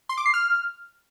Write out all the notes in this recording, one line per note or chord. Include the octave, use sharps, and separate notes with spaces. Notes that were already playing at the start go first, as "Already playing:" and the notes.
C6
D6
C7
F6